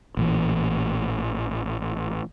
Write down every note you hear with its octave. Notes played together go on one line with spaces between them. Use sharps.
A1 A#2 E3